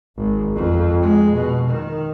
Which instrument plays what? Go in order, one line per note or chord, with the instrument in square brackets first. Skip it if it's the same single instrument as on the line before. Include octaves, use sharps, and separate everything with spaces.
[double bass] G#1
F2
G#3
B2
D#3